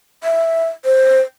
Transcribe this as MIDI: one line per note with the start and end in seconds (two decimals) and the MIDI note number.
0.24 0.66 76
0.85 1.21 72